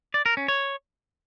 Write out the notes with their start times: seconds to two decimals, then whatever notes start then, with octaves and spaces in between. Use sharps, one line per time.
0.14 D5
0.26 A#4
0.37 C#4
0.48 C#5